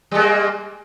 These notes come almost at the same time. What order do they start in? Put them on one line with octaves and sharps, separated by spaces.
G3 G#3 A#3